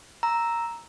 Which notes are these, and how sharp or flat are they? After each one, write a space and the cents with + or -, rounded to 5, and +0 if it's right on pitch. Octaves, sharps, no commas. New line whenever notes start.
A#5 +0 E6 +0